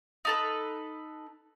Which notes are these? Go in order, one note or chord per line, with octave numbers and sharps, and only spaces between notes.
D#4 A4 B4